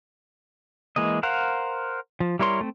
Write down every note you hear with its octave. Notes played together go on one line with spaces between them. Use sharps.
E3 G#3 A#3 D#5
A#4 C5 F5 F#5
F3
G3 E4 A#4 C#5 C6
A3 C4